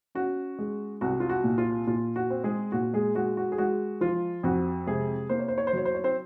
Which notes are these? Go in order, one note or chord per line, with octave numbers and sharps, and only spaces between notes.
C#4 F#4
G#3
C2 F#4
F4
F#4
A#2
F4
A#2 F4
F#4
C4
G#3 G#4
A#2 F#4
G#3 G#4
G#3 F#4
F#4
G#4
G#3 F#4
F3 F4
F2 F#4
C3 G#3 G#4
A#3 C5
C#5
C5
C#5
C5
F#3 C#5
C5
C#5
C4 C5